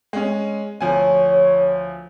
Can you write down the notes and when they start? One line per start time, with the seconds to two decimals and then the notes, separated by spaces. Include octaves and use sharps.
0.13 G#3 C#4
0.81 D2 F3 C#5 G#5